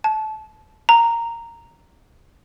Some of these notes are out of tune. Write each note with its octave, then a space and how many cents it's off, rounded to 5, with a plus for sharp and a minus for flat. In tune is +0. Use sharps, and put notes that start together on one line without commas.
A5 -25
A#5 -10